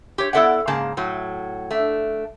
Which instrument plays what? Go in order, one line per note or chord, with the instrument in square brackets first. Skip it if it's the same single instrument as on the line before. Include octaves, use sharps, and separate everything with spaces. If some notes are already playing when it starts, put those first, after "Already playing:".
[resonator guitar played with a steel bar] G4 C#5
B3 E4 A4 D5 E5 F#5
G#2 C#3 A#3 G#4 A5
A2 F#3
A3 D4